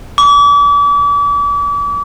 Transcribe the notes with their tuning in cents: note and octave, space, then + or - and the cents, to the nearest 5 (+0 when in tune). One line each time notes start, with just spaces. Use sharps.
D6 -40